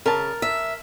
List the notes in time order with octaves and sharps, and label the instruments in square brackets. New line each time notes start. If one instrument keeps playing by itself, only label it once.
[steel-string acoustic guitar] C#3 [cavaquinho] A#4 A5
[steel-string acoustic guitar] E5